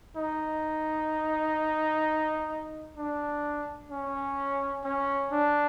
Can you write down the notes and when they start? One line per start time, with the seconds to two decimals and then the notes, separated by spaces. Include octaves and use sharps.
0.16 D#4
2.97 D4
3.90 C#4
4.84 C#4
5.31 D4